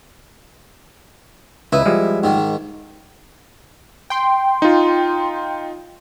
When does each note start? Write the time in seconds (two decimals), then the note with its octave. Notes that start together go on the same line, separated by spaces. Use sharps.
1.72 C#2 E4 B4 D#5
1.85 F3 G3 G#3
2.24 G#2 D#3
4.10 G5 C6
4.62 D#4 F4